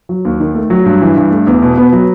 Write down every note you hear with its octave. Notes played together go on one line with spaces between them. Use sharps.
F#3
D#2
D#3
A3
F#3
G2
E3
G2
A3
E2
B2
B3
F#3